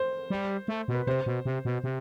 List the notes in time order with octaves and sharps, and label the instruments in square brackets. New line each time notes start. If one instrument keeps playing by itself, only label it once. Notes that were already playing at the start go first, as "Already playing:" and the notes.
Already playing: [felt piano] C5
[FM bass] G3
A3
B2
[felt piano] B4
[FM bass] C3 [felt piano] C5
[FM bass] B2
C3
B2
C3